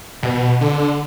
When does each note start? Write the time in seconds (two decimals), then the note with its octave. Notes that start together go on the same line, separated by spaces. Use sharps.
0.23 B2
0.61 D3